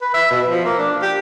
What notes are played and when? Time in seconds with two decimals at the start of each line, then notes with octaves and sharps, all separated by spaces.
0.01 B4
0.14 E5
0.30 B2
0.48 F3
0.65 A#3
0.78 D4
1.02 G4